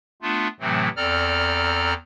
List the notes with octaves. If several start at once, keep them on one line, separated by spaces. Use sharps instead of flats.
A3 B3 D4 F4
A2 C3 E3 F#3 A3 C4
E2 C4 A4 D5 A#5 F6